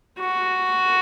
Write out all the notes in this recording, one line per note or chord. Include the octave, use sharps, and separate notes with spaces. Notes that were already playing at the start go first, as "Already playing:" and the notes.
F#4